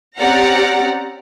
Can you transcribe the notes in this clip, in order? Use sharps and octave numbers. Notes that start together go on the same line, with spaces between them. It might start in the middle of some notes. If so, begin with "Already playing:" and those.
C4 C#4 G4 D5 F#5 A#5